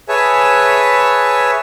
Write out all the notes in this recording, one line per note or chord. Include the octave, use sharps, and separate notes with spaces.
G#4 B4 C#5 E5 G#5 A5